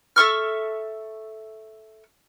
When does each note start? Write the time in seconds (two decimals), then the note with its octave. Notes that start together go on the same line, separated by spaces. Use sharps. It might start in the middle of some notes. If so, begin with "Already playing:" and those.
0.16 A4 E5 C#6 F6